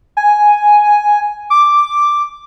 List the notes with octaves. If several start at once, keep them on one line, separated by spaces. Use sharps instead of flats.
G#5
D6